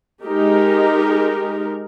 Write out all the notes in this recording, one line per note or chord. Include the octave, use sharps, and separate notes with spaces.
G#3 D#4 G4 A#4